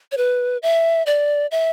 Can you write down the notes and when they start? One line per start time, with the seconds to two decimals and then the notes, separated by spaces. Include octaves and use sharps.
0.12 C#5
0.17 B4
0.63 E5
1.06 D5
1.51 E5